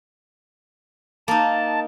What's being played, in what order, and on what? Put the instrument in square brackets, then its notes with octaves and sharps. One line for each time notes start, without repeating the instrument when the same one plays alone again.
[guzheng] A#3 D#4 [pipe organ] A5